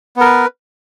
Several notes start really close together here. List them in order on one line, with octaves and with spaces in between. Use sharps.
B3 A#4 B4